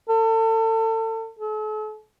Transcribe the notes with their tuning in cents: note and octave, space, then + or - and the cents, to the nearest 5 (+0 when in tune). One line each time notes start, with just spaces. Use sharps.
A4 +35
A4 -45